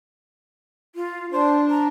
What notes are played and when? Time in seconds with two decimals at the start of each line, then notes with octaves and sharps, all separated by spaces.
0.95 F4
1.32 D4 C5
1.70 A#5